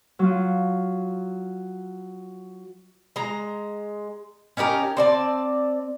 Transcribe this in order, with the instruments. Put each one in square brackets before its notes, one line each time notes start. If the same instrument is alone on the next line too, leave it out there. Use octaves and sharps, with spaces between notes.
[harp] F#3 F4
[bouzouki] G#3 A#5
C#4 D#4 G4 A#4
C4 D5 A5